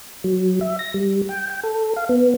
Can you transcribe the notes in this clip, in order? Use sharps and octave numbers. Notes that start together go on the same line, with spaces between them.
F#3
E5
A#6
G3
G5
G5
A4
F5
B3